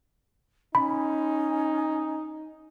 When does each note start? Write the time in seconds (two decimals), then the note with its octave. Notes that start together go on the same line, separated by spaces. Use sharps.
0.75 C#4 D#4 B5